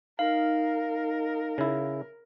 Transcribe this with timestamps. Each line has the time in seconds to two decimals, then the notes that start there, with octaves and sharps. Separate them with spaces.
0.19 D#4 A#4 F5
1.58 C#3 E4